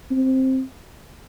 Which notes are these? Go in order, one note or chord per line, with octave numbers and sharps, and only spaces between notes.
C4